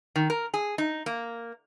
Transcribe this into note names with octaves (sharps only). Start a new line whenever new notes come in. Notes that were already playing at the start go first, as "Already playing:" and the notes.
D#3
A#4
G#4
D#4
A#3